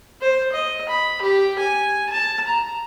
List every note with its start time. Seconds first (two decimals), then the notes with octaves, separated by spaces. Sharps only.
0.21 C5
0.52 D#5
0.89 B5
1.22 G4
1.59 G#5
2.10 A5
2.47 A#5